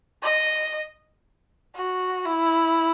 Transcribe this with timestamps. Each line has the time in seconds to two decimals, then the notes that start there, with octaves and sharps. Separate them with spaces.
0.22 D#5
1.75 F#4
2.26 E4